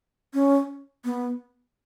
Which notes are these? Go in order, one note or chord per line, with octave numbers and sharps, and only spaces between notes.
C#4
B3